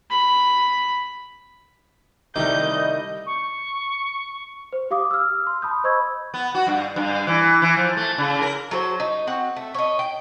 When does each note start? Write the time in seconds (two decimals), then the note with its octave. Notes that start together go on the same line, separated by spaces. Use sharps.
0.10 B5
2.36 C2 D#3 G3 A3 D#5 D6 G6
3.26 C#6
4.73 C5
4.91 G4 F5 D6 D#6
5.11 E6 F6
5.47 C6
5.62 A5 B5 D#6 G6
5.84 C5 D#5 B5 C#6 E6 G#6
6.34 B3
6.55 F#4
6.67 G2
6.96 G2
7.27 E3
7.62 E3
7.77 F3
7.97 A3
8.18 C#3
8.42 A#4
8.71 F#3 A4 C5
9.00 D#4
9.27 C4 F#4 F#5
9.56 A3
9.74 C#5 D#5
9.99 G5